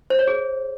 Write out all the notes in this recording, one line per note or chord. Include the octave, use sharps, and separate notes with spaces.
C5
C#5
G#4